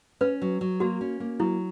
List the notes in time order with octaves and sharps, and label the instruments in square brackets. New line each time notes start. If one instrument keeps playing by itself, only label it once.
[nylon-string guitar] C#4 [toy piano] B4
[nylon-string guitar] F#3
F#3
[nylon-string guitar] A#3 [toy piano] F#4
[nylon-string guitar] C#4
A#3
[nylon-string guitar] F#3 [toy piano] E4